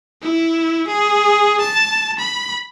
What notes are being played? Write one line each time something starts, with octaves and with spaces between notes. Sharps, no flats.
E4
G#4
A5
B5